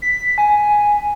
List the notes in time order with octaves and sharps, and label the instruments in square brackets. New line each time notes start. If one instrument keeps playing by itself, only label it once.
[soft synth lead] B6
G#5